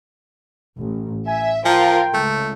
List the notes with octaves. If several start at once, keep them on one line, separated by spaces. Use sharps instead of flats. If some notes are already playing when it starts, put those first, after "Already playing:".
A1
E5 G#5
F3 F4 A#4 G5
C#2 A3